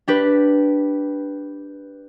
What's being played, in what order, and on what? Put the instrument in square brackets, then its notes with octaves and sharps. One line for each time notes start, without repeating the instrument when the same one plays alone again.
[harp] D4 G4 B4